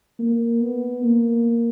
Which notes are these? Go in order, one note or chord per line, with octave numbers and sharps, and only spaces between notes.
A#3
B3
A#3